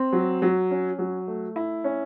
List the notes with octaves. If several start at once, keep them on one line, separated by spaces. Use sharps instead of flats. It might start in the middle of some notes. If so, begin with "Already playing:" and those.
Already playing: C4
F#3
F#3
C#4
F#3
A3
E4
C#4